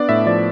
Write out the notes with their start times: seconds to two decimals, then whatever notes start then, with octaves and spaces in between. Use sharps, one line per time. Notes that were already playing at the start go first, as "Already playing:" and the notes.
Already playing: B3 D4 D5
0.09 A2 E5
0.26 F3 D5